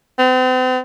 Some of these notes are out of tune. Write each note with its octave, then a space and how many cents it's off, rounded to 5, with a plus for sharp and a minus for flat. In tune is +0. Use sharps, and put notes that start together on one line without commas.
C4 -40